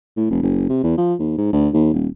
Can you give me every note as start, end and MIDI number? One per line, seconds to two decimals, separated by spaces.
0.17 0.26 45
0.31 0.42 29
0.43 0.68 30
0.69 0.81 48
0.84 0.96 40
0.98 1.14 53
1.19 1.34 39
1.38 1.48 44
1.53 1.69 38
1.74 1.91 39
1.93 2.08 27